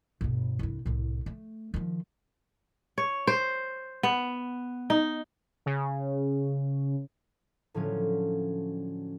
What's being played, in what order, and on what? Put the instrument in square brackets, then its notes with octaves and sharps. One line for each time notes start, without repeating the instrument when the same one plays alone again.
[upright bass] G1 B2
C2 G2
C2 A2
A3
D#3 F3
[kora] C#5
C5
B3
D#4
[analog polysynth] C#3
[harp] A2 D3 F3 F#3 C#4